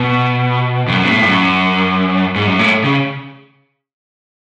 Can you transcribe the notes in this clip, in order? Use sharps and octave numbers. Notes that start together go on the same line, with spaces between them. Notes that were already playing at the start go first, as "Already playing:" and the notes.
Already playing: B2
F2
F#2
B2
A2
G#2
F#2
G#2
F#2
A2
C#3